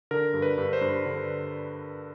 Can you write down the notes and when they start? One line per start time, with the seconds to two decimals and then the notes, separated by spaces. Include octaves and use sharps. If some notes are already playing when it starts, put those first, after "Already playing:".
0.11 D3 A#4
0.34 G2
0.42 B4
0.58 G2
0.73 C5
0.81 G2
1.06 D3